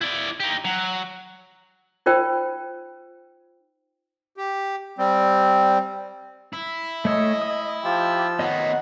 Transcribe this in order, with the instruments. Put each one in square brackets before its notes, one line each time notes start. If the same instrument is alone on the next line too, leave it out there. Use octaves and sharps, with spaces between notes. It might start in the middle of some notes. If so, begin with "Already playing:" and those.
[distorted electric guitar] E4 D5
D#4 G4
F#3
[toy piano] D#4 F4 A#4 C5 G5
[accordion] G4
G3 C4
[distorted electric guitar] E4
[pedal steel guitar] A3 C#5 E6 [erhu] D#5
[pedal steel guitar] D#6
[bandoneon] F3 F4 E6 [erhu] G4
[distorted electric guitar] D#3 B3 [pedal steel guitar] C#5 D#5 [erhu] F#5